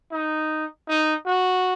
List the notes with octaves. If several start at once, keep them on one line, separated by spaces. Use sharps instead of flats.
D#4
D#4
F#4